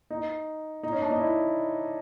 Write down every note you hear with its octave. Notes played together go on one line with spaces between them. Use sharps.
D#4
D#4
C#4
D4
D#4
E4